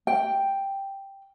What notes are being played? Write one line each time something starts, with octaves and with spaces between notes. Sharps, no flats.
G5